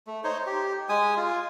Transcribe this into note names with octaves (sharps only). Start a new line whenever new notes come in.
A3
D#4 C5 C#5
G4
G#3 G#5 D#6
F4